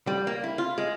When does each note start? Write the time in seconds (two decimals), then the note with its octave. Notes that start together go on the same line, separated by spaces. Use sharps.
0.07 G3
0.27 A#3
0.44 E4
0.58 F4
0.78 G#3